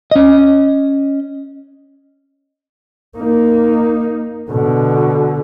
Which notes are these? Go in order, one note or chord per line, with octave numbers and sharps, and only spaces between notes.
C#4 D#5
A#3 D#4
B2 D3